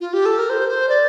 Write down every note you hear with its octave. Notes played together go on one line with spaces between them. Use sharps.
F4
G4
A4
A#4
C5
C5
D5